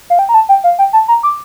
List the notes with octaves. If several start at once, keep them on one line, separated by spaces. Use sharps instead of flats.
F5
G5
A#5
A5
G5
F5
G5
A5
A#5
D6